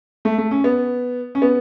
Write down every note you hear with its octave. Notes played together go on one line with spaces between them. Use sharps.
A3
A3
C#4
B3
C#4
B3